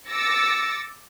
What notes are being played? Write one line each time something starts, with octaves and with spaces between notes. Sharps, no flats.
D6 E6 A6 A#6 C#7